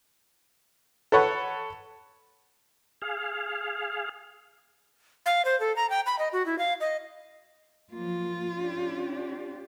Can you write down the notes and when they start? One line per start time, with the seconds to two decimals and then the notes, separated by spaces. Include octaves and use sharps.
1.12 A4 B4 C#5 F#5
3.02 G#4 F5
5.26 F5
5.45 C5
5.60 A4
5.76 A#5
5.90 G5
6.06 B5
6.19 D#5
6.33 F#4
6.46 E4
6.59 F5
6.81 D#5
7.93 F3 F#3 A#3 F4
8.54 C#4 D4 G4